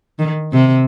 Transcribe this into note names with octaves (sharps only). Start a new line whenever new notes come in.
D#3
C3